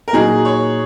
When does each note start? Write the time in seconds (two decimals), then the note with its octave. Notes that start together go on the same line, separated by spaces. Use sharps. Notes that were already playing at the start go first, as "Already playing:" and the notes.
0.08 A#4
0.13 A#2 F#3 D#4 F#4 G#4
0.45 C#5